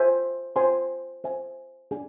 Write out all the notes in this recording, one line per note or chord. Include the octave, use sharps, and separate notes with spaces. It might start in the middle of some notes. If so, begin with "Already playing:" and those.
Already playing: C5 E5 G#5
C5 G#5 C6
C5 E5 G#5
D4 G#4 D5 G#5